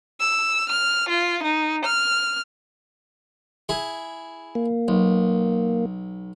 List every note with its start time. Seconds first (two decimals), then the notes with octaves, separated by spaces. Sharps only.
0.20 E6
0.69 F6
1.09 F4
1.43 D#4
1.85 F6
3.69 E4 G#4
4.55 A#3
4.88 B1